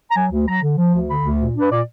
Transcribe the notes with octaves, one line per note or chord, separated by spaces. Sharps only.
A#5
F#3 G#5
D2
F#3 A#5
D3
F3
D2
D3 B5
D2
A#2
D4 B4
A#2 D5